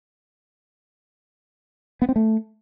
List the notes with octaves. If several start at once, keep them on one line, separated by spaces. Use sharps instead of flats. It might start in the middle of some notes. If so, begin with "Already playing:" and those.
B3
C4
A3